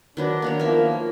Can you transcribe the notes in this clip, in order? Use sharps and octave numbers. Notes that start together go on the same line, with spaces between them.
D#3 F#3 D4 B4
A#3 B3 C#5
F3 A#3 A#4 E5